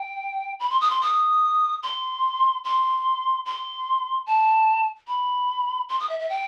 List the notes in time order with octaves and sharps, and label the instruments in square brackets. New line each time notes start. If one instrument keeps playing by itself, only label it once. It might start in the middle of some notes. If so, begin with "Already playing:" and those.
Already playing: [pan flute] G5
B5
C6
D#6
C6
D#6
C6
C6
C6
A5
B5
C6
D#6
E5
E5
G5